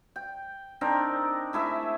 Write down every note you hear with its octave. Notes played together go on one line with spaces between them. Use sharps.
G5
C4 D4 D#4 A#4
A3 E4 G#4 E5